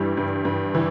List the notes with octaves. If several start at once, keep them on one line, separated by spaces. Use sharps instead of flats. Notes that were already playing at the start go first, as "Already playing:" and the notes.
Already playing: G2 E3 G3
G2
G2
E3